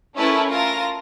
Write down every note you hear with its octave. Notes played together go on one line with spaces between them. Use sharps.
A3 C#4 E4 A#4 B4 A5
F4 A#4 A5 A#6